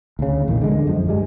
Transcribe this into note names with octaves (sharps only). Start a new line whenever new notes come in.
D2 C#3
A#1 E2 A2 D#3
D3 G#3
F#2 F3
G2 G3 G#3